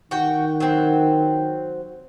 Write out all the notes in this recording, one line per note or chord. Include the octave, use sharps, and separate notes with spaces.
D#3 F#4 G5
F#3 C4